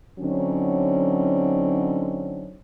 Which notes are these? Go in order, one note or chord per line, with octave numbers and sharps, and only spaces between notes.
D3 F#3 C4 C#4 D#4